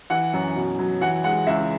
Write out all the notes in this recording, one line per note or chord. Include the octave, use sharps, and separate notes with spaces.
E3 F#5
F#2
B2
F#3
E3 F#5
G#3 F#5
C#2 E5